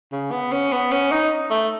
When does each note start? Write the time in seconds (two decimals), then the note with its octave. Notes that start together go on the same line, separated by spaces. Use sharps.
0.12 C#3
0.32 B3
0.52 C#4
0.72 B3
0.92 C#4
1.12 D#4
1.51 A3